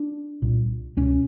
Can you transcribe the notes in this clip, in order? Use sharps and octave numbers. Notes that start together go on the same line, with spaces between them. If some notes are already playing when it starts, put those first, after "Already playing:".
Already playing: D4
C2 A#2
C#2 B2 C#4